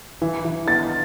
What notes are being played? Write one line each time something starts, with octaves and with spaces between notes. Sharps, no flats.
E3
E3
B3 A6